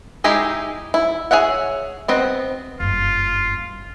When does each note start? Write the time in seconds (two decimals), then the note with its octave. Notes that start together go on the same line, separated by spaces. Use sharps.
0.24 G#3 D#4 E4 G4 G#4
0.94 E4
1.31 G#4 C#5 E5 F#5
2.08 B3 C4 D#5
2.80 F#1 G2 F4